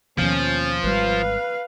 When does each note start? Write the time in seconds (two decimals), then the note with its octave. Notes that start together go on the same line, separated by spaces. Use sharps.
0.18 D#2 B2 F3 C#4
0.84 G#1 G3 B4 F5